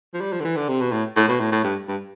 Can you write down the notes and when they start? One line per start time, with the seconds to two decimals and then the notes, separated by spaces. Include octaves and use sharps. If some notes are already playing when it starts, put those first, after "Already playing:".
0.14 F3
0.21 G3
0.33 F3
0.40 D3
0.45 E3
0.56 D3
0.69 C3
0.81 B2
0.92 A2
1.16 A2
1.29 B2
1.40 A2
1.52 A2
1.64 G2
1.88 G2